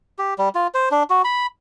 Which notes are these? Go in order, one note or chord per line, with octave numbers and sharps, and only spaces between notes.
G4
G3
F4
C5
D4
F#4
B5